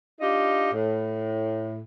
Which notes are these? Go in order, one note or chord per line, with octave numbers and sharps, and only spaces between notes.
D4 D#4 F4 G4
A2